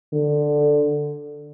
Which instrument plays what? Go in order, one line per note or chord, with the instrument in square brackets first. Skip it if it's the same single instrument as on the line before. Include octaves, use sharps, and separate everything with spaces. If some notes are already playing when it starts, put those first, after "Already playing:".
[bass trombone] D3